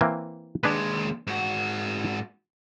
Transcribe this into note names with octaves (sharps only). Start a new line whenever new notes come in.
E3 A#3 C4
D#2 G#3 D4 G#4 B4
G#2 F#4